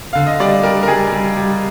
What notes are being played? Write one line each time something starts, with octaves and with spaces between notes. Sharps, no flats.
D3 F5
D#5
G3 D5
G3 A#4
A#4
G3 G#4
G3
G3